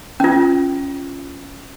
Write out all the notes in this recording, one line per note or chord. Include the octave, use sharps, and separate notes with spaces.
C#4 F4